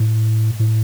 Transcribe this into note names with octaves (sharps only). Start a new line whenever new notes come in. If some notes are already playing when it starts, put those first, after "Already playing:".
Already playing: A2
A2